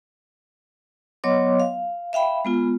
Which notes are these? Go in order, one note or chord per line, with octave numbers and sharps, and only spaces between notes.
F#3 B3 C#5 D#5 C6 D6
F5
E5 F5 G5 B5
G#3 B3 F4